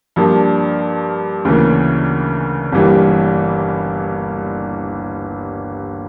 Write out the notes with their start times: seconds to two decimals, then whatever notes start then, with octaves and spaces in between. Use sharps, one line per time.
0.16 G2 F3 A#3 D4
1.45 D2 C#3 E3 A#3
2.72 G1 G2 E3 G3 A#3